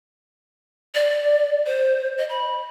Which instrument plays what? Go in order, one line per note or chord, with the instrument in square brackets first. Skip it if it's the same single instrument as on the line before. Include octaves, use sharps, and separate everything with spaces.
[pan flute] D5
C5
D#5
B5